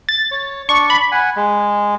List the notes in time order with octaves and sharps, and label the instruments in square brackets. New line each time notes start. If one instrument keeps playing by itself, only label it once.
[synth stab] A6
[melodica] C#5
[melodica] D4 D5 [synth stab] C#6
[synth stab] B5
[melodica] F#5 G#5
G#3